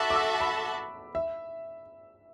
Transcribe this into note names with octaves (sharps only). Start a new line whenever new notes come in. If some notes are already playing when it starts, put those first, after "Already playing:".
Already playing: F#4 A4 E5 A5 B5 D6
D6
E6
B5
E5